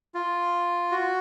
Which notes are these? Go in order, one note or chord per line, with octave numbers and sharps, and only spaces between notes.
F4
F#4